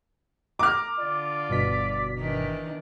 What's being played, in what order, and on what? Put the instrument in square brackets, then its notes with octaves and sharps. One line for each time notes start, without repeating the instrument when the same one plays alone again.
[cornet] A#5 [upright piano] D6 F6
[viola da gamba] D3 F4 [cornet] D5
[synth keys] G1 B2 B6
[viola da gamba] D#3 E3 D4